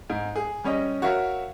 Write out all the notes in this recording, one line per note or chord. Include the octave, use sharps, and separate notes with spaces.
G#2
G#4
G3 C#4 C#5 D#5
F#4 A#4 C#5 E5 F5